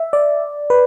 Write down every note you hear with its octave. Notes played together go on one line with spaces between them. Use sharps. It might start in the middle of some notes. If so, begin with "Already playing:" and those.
Already playing: E5
D5
B4